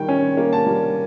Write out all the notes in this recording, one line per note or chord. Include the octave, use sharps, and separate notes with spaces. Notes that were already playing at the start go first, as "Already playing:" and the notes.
Already playing: D#3 G3 A#3 G5
C#4
A#3
A5
G3